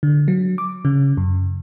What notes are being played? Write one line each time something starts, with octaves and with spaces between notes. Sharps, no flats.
D3
F#3
D6
C#3
F#2